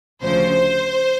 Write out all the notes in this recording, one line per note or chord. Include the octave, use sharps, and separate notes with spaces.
D2 C#3 F3 C5